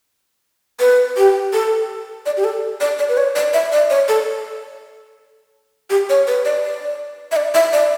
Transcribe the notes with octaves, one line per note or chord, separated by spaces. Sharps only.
B4
G4
A4
D5
G4
A4
D5
D5
B4
C#5
D5
E5
D5
C#5
A4
G4
C#5
B4
D5
D5
E5
D5
E5
D5